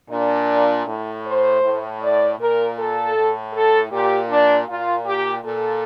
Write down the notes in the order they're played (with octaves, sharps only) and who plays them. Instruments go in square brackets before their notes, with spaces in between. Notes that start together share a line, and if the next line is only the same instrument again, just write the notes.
[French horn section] A#2 D4
A2
C5
A2
D5
A#2 A#4
A4
A2
A4
A#2 G4
D4
A#2 F4
G4
A#2 A4